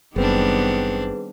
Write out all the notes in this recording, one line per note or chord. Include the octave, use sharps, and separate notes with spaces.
F#1 D#3 G3 B3 C4 D4 G#4 B4